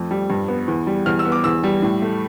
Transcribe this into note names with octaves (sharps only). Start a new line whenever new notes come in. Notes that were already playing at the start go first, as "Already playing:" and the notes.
Already playing: F2 A3
G3
G2
B3
E2
G3
E2 F6
E6
B3
D6
E2 E6
G3
A2
A3